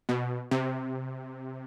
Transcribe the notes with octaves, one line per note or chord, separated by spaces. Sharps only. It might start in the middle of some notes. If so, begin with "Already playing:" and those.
B2
C3